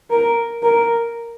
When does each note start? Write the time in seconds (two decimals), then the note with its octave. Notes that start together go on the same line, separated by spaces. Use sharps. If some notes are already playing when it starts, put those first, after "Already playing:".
0.10 A#4
0.63 A#4